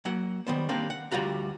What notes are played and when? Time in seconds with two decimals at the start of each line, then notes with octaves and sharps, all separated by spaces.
0.05 F#3 A#3 F#5
0.47 D#3 G3 B3 C5
0.69 D#3 G3 A#3 C4 D4
0.90 F#5
1.12 D2 G3 F4 F#4 A#5